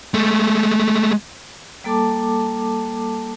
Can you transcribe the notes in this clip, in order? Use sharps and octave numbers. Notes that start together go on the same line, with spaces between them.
G#3 A3
G3 A#3 A4 A5 D6